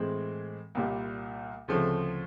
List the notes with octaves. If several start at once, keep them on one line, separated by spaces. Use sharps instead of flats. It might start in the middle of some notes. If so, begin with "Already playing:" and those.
Already playing: A2 E3 G#3 C4
C2 A#2 G3
D2 C#3 F3 A3 C4